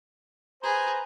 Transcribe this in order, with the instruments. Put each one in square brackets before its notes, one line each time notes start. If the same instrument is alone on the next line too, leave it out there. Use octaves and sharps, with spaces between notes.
[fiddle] G#4 [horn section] B4 C5 A#5